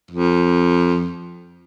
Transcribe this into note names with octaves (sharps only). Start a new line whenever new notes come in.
F2